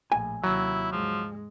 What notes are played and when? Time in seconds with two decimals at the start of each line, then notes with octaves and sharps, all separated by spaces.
0.12 A#1 A2 G#5
0.44 D#2 C3 F#3 E4
0.92 G#2 F3 G#3